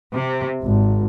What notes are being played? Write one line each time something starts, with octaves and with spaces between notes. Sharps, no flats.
C3
G#1